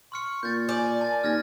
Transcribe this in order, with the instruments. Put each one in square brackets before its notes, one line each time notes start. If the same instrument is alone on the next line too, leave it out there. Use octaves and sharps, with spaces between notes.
[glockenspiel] C6 F6 C#7 [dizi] C#6
[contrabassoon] A#2 [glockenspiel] G6 A6
[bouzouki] D5 [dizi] G#5 [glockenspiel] G6
[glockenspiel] A5 A6
[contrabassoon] D#2 [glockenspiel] F6 G#6 A#6